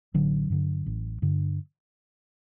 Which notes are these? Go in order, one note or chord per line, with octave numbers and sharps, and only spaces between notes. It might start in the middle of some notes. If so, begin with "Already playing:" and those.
A1 D3 F#3
G2 D3
A1
G2 D3